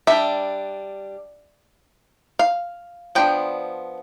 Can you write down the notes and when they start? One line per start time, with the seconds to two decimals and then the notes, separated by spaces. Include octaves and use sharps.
0.07 G3 D4 E5
2.39 F5
3.15 F3 B3 D4 G5